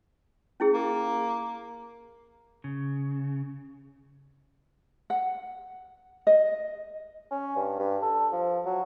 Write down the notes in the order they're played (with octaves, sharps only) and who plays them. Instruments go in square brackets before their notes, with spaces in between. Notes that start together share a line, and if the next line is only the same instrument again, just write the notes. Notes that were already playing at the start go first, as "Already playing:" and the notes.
[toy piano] C#4 E4 G#4
[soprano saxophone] A#3
[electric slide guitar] C#3
[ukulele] F#5
D#5
[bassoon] C#4
G2
G2
A4
F3
F#3